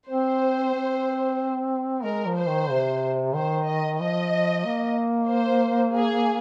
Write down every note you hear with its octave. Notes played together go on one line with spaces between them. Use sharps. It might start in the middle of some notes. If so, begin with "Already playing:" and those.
C4 C5
C4
G#3 A#4
F3
C5
D#3
C3
D#3 C5
D#5
F3 D#5
A#3
C5
G#4